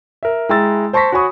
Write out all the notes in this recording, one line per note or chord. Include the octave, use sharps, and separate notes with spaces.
A#4 E5
G#3 E4 G5 A#5 E6 A6
C5 A5 C6 C#6 A#6 B6
F#4 C#5 G#5 B5 C#6 D#6